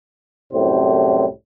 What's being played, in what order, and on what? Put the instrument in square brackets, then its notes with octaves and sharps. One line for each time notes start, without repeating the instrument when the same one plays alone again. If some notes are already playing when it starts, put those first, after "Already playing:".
[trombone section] C2 F#2 A2 G3 C4 C5